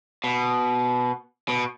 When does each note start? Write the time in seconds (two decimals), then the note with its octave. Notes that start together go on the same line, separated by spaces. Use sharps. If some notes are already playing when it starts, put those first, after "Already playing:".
0.24 B2
1.48 B2